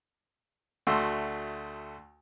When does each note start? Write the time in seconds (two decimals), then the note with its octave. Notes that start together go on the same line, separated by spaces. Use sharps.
0.87 D2 A3 F#4 C6 E6